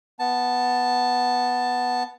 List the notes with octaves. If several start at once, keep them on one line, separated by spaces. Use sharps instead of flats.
B3 A5